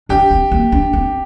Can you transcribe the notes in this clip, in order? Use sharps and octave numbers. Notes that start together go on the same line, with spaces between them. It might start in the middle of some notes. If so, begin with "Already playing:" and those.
D4 G4
C4
A#3
D4
C4